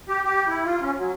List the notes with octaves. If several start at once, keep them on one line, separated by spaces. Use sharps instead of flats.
G4
G4
E4
F4
C#4
F#3